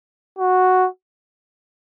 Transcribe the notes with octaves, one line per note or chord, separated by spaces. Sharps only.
F#4